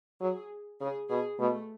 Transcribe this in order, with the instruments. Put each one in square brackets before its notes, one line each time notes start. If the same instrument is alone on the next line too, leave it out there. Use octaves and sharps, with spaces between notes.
[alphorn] F#3 [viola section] G#4
[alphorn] C#3 [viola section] G#4
[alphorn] B2 [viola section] G#4
[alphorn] B2 [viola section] A3